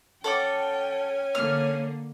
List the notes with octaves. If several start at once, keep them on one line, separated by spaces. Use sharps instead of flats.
C#4 A4 F#5 G5 D6
D3 A#3 F6